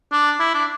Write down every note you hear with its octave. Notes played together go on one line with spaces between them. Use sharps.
D4
E4
D4